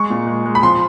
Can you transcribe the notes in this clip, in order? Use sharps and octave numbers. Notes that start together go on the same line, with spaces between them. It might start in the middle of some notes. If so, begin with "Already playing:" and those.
Already playing: G#3 C#6
A#2
G#3
G#3
B5
F3 C6